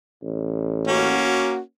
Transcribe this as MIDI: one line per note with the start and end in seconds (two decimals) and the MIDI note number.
0.22 1.26 33
0.88 1.60 58
0.88 1.60 61
0.88 1.59 66